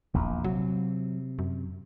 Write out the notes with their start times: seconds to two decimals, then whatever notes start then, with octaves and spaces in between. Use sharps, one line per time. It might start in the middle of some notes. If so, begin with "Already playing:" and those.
0.14 D#1 A#1 E2
0.44 C3 F#3
1.39 F#2